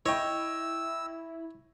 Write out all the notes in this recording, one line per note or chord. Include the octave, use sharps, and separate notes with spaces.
E4 C#5 D#5 G5 E6